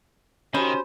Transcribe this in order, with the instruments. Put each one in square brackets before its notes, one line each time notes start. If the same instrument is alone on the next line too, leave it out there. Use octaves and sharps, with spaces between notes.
[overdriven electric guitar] D#3 [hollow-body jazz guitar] C#4 [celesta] F#4 G4 B5 [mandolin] C5